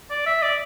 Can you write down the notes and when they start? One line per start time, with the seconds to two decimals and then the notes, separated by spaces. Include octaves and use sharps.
0.10 D5
0.26 E5
0.42 D5